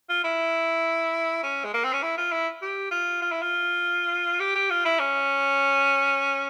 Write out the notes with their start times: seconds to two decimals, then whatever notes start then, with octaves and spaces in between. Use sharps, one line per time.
0.09 F4
0.24 E4
1.43 C#4
1.64 G#3
1.74 A#3
1.84 C4
1.93 C#4
2.03 E4
2.18 F4
2.32 E4
2.62 G4
2.91 F4
3.22 F4
3.32 E4
3.42 F4
4.40 G4
4.55 G4
4.70 F4
4.85 E4
5.00 C#4